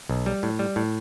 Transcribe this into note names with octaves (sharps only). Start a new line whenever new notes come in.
B1
G3
A2
G3
A2